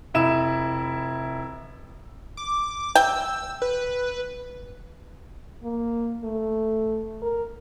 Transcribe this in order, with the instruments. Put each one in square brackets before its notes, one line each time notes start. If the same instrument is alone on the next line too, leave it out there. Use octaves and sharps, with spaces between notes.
[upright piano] F1 E4 E7
[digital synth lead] D6
[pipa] G5 [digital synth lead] E6
[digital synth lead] B4
[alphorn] A#3
A3
A#4